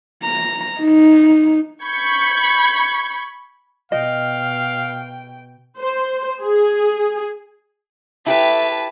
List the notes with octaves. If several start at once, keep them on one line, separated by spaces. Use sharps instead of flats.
A#5
D#4
B5 C#6 G6 G#6 C#7
B2 D#5 F5 G5
C5
G#4
A3 E4 G4 B4 A5